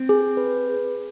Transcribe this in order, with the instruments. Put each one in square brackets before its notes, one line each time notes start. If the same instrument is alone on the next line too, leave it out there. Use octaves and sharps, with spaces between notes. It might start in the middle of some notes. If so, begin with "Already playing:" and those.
Already playing: [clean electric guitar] C4
[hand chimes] G#4
B4